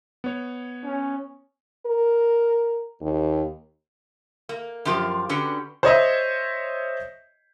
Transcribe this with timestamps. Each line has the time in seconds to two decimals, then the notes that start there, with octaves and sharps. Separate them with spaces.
0.24 B3 C#5
0.85 C#4
1.86 A#4
3.01 D#2
4.49 A#3
4.85 F#2 F3 F4 G4 A#4
5.29 D3 C#4 F#4 G4 B4
5.83 C5 C#5 D#5 E5